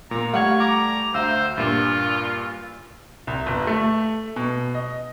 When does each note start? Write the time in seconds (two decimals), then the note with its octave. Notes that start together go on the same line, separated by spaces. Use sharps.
0.11 A#2 A#3 A#5
0.34 G3 A3 F5 F#5 C#6 G#6
0.60 A#5 D6
1.14 D2 C5 E5 F5 E6
1.58 G2 A#2 F4
3.27 C2
3.46 G1
3.67 A3
4.36 B2
4.75 D#5